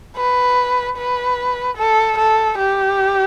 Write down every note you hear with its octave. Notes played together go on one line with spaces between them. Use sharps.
B4
B4
A4
A4
G4